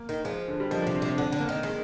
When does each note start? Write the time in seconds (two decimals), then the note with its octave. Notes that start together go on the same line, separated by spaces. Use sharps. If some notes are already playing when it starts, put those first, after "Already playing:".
Already playing: A#3
0.09 D#3
0.25 F3 G#3
0.48 D3
0.60 G3
0.71 D#3 F3
0.82 D4
0.87 C3
0.95 C4
1.02 C3 D4
1.17 D3 D4
1.32 D3
1.40 A#3
1.49 D#3
1.63 D#3 G#3